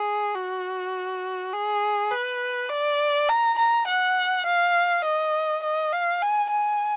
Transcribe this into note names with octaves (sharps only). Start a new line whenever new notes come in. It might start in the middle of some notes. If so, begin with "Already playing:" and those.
Already playing: G#4
F#4
G#4
B4
D5
A#5
A#5
F#5
F5
D#5
D#5
F5
G#5
G#5